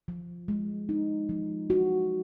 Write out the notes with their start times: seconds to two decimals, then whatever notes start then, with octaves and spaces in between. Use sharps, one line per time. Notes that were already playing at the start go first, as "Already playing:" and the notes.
0.08 F3
0.48 G#3
0.89 D#4
1.29 F3
1.70 F#4